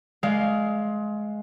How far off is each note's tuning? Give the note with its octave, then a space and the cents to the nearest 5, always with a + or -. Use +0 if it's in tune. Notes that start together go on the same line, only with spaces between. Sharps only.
G#3 +20 D5 +15 F5 +0